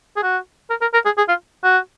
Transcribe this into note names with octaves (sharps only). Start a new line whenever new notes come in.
G#4
F#4
A#4
A#4
A#4
G#4
G#4
F4
F#4